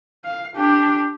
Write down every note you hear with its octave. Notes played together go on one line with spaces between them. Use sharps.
F5
D4 G4